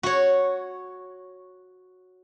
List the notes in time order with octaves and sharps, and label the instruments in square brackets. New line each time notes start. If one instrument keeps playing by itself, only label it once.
[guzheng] F#4 C#5